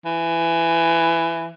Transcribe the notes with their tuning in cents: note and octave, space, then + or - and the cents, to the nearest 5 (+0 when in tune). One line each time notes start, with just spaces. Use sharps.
E3 +15